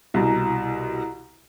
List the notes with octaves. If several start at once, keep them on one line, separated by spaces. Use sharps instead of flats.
C2 B2 E4 A#5